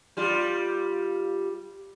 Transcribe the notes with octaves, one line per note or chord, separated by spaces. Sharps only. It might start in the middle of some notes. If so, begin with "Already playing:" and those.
G3 F4